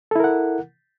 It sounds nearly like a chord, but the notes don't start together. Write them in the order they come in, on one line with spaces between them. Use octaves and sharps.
A4 E4 A#4 F#5